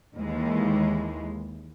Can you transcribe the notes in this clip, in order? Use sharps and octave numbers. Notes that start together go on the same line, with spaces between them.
D#2 E3 G#3